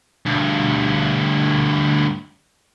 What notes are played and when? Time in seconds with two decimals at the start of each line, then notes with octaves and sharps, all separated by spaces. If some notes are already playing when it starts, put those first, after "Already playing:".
0.27 D2 G2